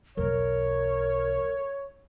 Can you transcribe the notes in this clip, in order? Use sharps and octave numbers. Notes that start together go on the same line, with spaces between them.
B1 E2 A#4 C#5